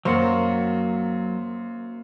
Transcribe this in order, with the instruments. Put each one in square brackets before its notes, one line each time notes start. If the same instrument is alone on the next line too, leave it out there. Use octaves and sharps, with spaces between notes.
[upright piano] F#2 C5 [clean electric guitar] F#3 F#4 [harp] A#3